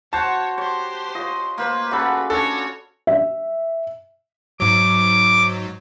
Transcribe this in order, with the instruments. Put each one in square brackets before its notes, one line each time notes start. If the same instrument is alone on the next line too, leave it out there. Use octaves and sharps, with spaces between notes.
[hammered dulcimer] F#4 C5 [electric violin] C#5 [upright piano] A5
[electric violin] G4 C5 [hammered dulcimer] C#5
[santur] F4 C#5 [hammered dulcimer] D#5
[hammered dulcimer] A#3 C5 [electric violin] B4
[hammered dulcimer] C#3 F#4 A4 [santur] A5 B5
[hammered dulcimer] C#4 D4 [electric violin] F#4 C#5 [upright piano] A4
[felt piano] E5
[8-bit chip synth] G#2 F#3 [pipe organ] D6